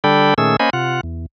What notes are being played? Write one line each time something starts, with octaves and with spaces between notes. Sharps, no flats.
D3 G3 D4 A4 G5 B5
A#2 D#3 A3 C#4 G#4 E6
A#3 C#4 C5 D#5 G#5 B5
C3 F4 F#5
E2